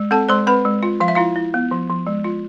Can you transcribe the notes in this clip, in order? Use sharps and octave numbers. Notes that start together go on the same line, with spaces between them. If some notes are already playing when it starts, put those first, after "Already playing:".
Already playing: G#3
C4 A4 A5
G#3 C5 C6
C4 B4 B5
G#3
F4
F3 F5
E5
E4 F4 F5
E4
B3
F3
F3
G#3
F4